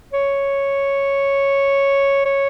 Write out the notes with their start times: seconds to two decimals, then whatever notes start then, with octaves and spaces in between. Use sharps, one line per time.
0.13 C#5
2.25 C#5